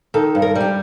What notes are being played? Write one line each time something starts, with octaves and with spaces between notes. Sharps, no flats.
D#3 A4
G2
A#4
G3
G4